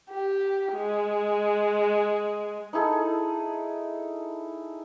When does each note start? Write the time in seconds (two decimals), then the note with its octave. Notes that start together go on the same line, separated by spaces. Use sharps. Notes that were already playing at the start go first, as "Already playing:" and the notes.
0.10 G4
0.74 G#3
2.73 D#4 E4 G#4 A4